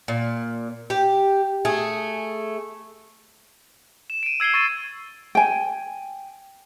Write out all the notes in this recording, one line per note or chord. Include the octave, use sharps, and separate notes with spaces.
A#2
G4
A3 G#4
E7
D7 D#7
E6 G#6 C7 E7 G7
C#6 E6 A6 D#7
G5 G#5